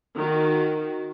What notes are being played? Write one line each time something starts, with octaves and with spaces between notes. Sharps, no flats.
D#3 F#4